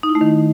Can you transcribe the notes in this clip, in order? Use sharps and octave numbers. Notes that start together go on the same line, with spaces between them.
D#4
E4
A3
D#3